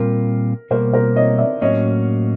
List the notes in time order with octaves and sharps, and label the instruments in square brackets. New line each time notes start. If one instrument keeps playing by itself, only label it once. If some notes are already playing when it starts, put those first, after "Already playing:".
Already playing: [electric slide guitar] A#2 G3 C4 F4 [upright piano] A#4
[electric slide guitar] B2 G3 A#3 [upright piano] A#4 C5
[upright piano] A#4 C5
C#5 D#5
D5 E5
[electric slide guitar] A2 F#3 A#3 C#4 F#4 [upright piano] C#5 D#5